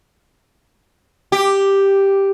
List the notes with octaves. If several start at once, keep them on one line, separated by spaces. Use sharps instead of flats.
G4